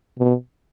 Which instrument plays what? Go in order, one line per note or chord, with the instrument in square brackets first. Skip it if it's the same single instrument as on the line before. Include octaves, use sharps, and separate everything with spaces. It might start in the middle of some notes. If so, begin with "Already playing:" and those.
[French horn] B2